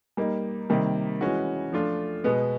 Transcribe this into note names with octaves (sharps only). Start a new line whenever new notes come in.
G3 A#3 D#4
C3 D#3 G3 A#3
E3 G#3 C#4 F#4
F3 A3 D4 F4
B2 G#3 B3